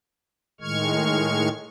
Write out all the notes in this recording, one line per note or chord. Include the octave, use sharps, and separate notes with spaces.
A2 D#3 G#3 C#6 F6 G#6